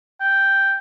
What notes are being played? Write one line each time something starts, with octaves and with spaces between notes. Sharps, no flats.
G5